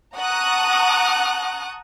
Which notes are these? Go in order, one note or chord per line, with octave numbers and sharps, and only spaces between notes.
F#5 A5 A#5 C#6 D#6 F#6